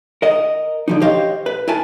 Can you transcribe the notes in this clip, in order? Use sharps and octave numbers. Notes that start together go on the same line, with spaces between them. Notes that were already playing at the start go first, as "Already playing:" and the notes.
A#4 D#5
D3 F3 D#4
G4 C5 C#5 D#5 F5
B4
E4 A#4 G#5 A5